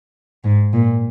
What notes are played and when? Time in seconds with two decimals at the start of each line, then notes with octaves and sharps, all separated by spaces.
0.44 G#2
0.73 A#2